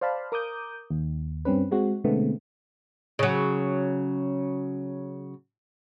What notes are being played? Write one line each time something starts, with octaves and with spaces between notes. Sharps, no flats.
C5 D5 F5 A5 B5
A#4 D6 D#6 G6
D#2
G2 C4 C#4 B4
G#3 C4 F#4
B2 D3 G#3 A3 B3 C4
C#3 F#3